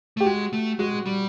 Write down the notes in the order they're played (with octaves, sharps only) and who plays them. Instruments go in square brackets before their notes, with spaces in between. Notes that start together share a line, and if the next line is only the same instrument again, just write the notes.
[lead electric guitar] A3 [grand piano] G4
[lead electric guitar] G#3 [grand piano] F#4
[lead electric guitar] A3
[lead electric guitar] G#3 [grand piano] F#4
[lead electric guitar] G3